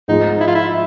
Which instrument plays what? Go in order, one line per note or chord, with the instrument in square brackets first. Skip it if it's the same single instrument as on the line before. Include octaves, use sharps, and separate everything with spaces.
[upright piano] G#2 F3 G#3 [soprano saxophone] D#4
[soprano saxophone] E4
F4
E4